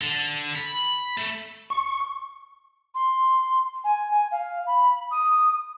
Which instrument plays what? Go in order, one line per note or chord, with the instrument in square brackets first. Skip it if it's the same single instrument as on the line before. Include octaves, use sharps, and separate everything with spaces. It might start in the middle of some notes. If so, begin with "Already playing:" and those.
[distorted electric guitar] D3
B5
A3
[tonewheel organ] C#6
[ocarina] C6
G#5
G#5
F5
B5
D#6